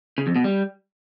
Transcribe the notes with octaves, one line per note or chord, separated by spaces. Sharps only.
C#3
F2
B2
G3